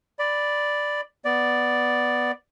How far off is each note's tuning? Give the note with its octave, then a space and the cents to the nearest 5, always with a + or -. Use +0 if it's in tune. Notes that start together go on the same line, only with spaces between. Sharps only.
D5 +0 B5 +5
B3 +0 D5 +0